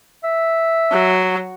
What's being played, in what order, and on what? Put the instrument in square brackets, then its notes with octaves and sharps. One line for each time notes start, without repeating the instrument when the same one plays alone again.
[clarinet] E5
[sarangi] F#3